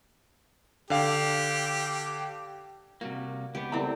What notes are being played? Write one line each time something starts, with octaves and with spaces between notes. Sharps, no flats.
D3 G4 F5
C3 G3 A#3 F#4
C#2 B3 G4
G3 A3 C4 E4 A#4 A#5